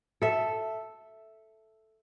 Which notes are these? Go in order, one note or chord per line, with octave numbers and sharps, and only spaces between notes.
A4 E5